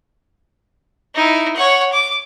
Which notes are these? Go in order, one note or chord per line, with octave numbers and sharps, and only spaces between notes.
D#4 E4
C#5 F#5
D6